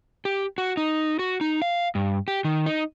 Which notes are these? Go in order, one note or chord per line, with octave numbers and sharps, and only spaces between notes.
G4
F#4
D#4
F#4
D#4
F5
G2
G4
D#3
D#4